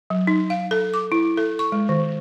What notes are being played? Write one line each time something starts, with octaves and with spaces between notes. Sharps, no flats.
F#3
D#4
F5
A4
D6
E4
A4
C#6
G#3
D#3